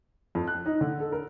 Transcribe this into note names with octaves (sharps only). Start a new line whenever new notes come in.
F2
F#6
D#4
D3
A4
A#4